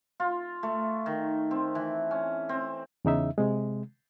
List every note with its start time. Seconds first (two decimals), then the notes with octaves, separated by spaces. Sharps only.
0.20 F4
0.63 A3
1.06 D#3
1.51 C4
1.75 E3
2.11 C#4
2.49 C4
3.05 E2 C#3 D#4 E5
3.38 C3 G#3